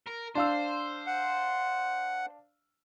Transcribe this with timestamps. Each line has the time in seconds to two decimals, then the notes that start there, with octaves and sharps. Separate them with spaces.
0.07 A#4
0.35 D4 C5 F5 E6
1.07 F#5